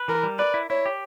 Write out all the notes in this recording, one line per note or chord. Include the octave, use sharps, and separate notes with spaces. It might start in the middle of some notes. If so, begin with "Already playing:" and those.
Already playing: B4
E3 A#4
G3
B4 D5
E4
E4 C#5
G4